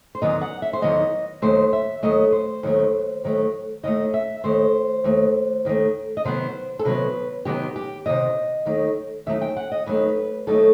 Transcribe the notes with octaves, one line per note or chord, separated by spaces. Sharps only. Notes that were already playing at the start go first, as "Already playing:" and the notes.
C5
E2 D#3 F#3 B3 D#4 D#5
F#5
E5
C5
E2 D#3 F#3 B3 D#4 D#5
D#2 D#3 F#3 A3 C5
E5
D#2 D#3 F#3 A3 D#5
C5
D#2 D#3 F#3 A3
D#2 D#3 F#3 A3
D#2 D#3 A3 D#5
E5
D#2 D#3 A3 C5
D#2 D#3 A3
D#2 D#3 A3
D#5
C3 D#3 F#3 B3 C5
A4
C3 D#3 F#3 B3 B4
C3 D#3 F#3 B3 G4
G4
C3 D#3 F#3 B3 D#5
D#2 D#3 F#3 A3 D#4
D#2 D#3 F#3 A3 D#4 E5
G5
F#5
D#5
D#2 D#3 F#3 A3 D#4 B4
D#2 D#3 F#3 A3 D#4 A4